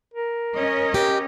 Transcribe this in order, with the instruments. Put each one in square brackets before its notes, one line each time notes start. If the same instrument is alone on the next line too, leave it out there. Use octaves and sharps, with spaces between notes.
[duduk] A#4
[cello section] C#4 D#5
[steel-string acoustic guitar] G4